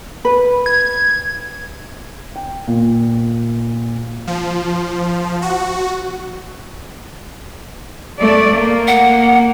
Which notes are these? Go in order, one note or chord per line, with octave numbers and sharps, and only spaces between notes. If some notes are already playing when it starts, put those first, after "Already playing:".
B4
G#6
G5
A#2
F3
F#4
A3 D5
A#3
F#5